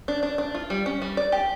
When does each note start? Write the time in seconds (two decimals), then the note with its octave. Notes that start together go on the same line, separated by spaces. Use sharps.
0.08 D4
0.23 D4
0.38 D4
0.55 F4
0.70 G3
0.86 C#4
1.02 G3
1.17 D5
1.32 G4